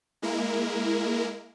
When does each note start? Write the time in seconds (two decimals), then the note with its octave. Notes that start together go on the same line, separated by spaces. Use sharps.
0.22 G#3 A#3 E4 A#4